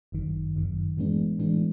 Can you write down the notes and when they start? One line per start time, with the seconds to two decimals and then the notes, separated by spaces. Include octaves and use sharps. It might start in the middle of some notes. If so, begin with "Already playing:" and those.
0.12 G1 F#2 D#3
0.55 G1 F#2 D#3
0.97 A2 E3 G#3 B3 D4
1.39 A2 E3 G#3 B3 D4